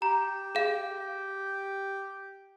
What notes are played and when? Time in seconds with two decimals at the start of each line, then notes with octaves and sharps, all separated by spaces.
0.02 G4 A#5
0.55 G#4 F5